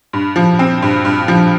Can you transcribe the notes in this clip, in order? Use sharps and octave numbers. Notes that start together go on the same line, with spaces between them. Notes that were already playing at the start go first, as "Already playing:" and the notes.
G2
F3
C4
G2
G2
F3